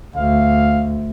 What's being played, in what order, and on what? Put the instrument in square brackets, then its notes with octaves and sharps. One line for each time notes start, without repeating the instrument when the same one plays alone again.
[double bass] D2 [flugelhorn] F5